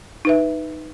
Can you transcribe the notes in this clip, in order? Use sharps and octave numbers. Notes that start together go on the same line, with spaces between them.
D#4 B4 E5